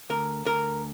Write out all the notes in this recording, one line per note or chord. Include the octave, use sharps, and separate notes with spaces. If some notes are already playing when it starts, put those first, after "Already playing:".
D2 A#4
D2 A#4